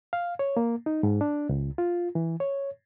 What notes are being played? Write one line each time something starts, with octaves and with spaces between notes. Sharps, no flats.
F5
C#5
A#3
D#4
G#2
D4
C#2
F4
E3
C#5